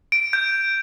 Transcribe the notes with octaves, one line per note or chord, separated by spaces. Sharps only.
D7
G6